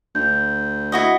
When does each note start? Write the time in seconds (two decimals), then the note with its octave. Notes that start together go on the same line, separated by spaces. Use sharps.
0.15 D2 G6
0.92 E4 F#4 D#5